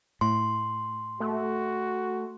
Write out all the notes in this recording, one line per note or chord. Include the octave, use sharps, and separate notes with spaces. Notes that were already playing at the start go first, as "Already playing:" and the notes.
A2 C6
A3 F#4